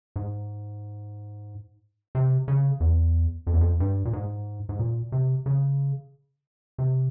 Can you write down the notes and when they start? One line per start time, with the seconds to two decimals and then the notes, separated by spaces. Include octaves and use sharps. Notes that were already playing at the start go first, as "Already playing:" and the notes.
0.16 G#2
2.15 C3
2.48 C#3
2.80 E2
3.47 F2
3.54 E2
3.61 F2
3.80 G2
4.05 A#2
4.13 G#2
4.69 G#2
4.79 A#2
5.12 C3
5.46 C#3
6.78 C3